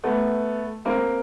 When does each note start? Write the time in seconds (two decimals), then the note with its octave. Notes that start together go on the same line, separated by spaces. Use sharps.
0.04 A3 B3
0.85 A#3 C4